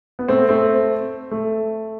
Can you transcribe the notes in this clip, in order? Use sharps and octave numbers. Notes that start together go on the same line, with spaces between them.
B3
A3 C4
A3 C4
A3